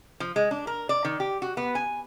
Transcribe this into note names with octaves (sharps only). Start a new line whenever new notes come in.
F3
G#3
D4
A#4
D5
D#3
G4
F#4
B3
G#5